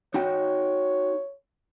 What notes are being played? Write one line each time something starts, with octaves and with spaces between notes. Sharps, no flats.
D#4 F#4 C#5 G5